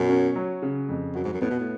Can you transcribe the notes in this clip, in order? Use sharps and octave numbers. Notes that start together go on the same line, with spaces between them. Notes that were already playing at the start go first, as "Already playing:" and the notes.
Already playing: F#2 B2
C#4
F#3
C#3
F2
F#2 F#4
G#2
F#2
A2 B3
B2
A2